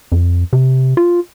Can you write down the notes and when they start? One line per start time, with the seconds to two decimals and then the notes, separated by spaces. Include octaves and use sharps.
0.12 F2
0.53 C3
0.97 F4